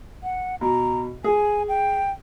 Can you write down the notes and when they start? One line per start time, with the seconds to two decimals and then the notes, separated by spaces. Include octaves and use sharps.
0.23 F#5
0.61 B2 A#5
1.24 G#4 G#5
1.69 G5